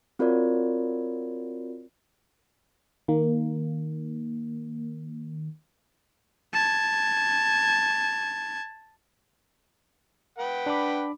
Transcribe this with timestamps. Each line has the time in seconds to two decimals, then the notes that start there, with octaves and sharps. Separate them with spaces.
0.19 C4 F4 F#4 A#4 C#5 D5
3.08 D#3 A#3
6.53 A5 G#6
10.38 B4 F#5 G5
10.66 D4 B5 D6